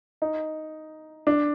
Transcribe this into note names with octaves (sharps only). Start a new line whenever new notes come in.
D#4
D4